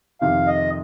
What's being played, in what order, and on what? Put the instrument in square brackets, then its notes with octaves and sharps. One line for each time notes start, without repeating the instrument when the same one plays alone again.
[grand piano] F2 C3 D#3 [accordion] F5
[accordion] D#5